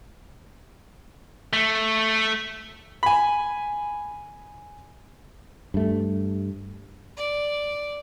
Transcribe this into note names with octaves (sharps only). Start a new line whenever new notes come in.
A3
G#5 B5
G2 A3
D5